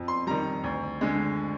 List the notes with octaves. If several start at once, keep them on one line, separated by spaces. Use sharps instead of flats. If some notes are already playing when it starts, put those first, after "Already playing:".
Already playing: F2
C6
D#3 G3 A#5
D2
D3 G#3